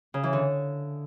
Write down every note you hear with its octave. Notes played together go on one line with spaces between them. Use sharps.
C#3
E3
D3